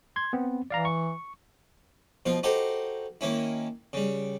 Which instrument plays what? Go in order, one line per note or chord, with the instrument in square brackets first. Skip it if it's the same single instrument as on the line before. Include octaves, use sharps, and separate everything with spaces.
[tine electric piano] C6 G#6
B3 C4
[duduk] E3 [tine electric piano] D5 F5 A#5
[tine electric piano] C#6
[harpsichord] B2 F3 F4
D#4 F#4 G4 A4 C5
D#3 A#3 C#4 E4
C#3 G3